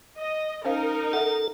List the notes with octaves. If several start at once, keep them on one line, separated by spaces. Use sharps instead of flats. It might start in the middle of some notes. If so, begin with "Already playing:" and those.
D#5
C#4 D#4 A#4 C5 F5
A4 E5 F#5